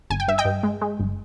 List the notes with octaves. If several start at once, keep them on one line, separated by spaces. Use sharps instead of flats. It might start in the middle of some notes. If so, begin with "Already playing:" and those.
G1 G#5
G5
G2 E5
D#5 G5
G2
G#3
G#3
G1